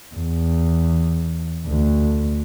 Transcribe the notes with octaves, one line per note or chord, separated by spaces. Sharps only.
E2
D2